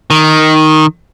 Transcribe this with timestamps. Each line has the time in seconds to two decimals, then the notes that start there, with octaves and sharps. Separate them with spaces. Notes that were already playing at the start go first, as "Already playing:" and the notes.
0.11 D#3